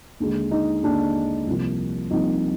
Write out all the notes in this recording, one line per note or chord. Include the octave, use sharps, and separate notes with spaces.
D#2 D3 G#3
D#4
D#2 D3 G#3 D4
C2 C3 F3 A#3
C2 C3 F3 A#3 D#4